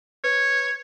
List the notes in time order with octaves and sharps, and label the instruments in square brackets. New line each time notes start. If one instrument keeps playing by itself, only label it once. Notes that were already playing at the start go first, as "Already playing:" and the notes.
[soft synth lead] B4 [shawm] C#5